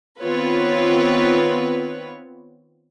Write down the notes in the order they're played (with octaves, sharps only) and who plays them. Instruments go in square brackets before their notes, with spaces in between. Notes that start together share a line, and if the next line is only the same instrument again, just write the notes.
[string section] D#3 B3 C4 F4 B4 C#5